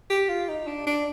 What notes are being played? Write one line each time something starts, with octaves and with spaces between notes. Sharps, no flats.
G4
F4
D#4
D4
D4